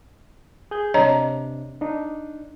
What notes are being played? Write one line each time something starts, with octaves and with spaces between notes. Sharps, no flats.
G#4 G6
C3 D4 C#5 D#5 A#5
D4 D#4